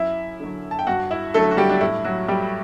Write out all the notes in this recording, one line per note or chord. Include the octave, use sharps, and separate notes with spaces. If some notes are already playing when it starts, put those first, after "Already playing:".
Already playing: F#2 E4 E5
D3 F#3
A5
G5
G2 F#4 F#5
E4 E5
D3 F#3 A3 A4
F#4
G3 G4
D4
A2 E4
F#3 F#4
G3 G4